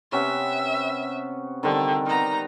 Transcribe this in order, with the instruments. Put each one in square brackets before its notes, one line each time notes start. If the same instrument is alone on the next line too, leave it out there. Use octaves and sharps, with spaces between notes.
[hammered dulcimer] C3 B3 C#4 [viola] E5
[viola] D3 [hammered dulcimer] D#3 G3 C4
[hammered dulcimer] B3 A#4 [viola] D#4 A#5